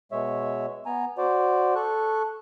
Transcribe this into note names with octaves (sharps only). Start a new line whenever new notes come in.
B2 G#3 C#5 E5
B3 G#5 A#5
F#4 C5 D5
A4 C#6 F#6